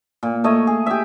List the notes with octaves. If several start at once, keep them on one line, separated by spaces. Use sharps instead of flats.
A#2
A3 C#5 D#5
G#4
G4 E5